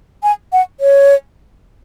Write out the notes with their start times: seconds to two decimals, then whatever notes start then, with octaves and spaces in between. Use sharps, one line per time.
0.23 G#5
0.52 F#5
0.80 C#5